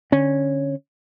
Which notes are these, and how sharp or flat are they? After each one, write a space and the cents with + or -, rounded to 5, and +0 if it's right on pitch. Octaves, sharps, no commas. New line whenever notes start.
D3 +0 C#4 -10